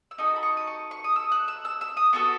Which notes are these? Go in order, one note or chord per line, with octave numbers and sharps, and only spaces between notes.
E6
D#4 F#4 A4 D#6
B5
C#6
D#6
C#6
C#6
D#6
E6
F#6
E6
E6
E6
D#6
B3 F#4 A4 C#6